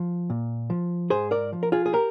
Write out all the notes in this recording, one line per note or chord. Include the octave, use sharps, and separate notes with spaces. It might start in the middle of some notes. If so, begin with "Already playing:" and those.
Already playing: F3
A#2
F3
G#2 G#4 C5
A#4 D5
F3
A#4
F4 G#4
G#4
G4 A#4